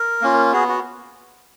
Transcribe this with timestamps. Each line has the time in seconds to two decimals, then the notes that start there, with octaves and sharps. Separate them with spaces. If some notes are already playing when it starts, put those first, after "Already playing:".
Already playing: A#4
0.22 A#3 C#4 F4
0.52 B3 F#4 G#4
0.68 F#4